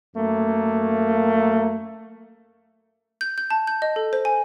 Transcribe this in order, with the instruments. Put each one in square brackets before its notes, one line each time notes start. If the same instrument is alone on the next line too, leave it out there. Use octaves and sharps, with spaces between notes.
[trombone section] F#2 A3 A#3
[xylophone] G6
G6
A5
G6
D#5
A4
C5
G#5